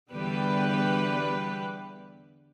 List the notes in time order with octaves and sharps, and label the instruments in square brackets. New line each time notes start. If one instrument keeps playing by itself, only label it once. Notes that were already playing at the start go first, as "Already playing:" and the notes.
[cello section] E2 D3 G3 G4 B4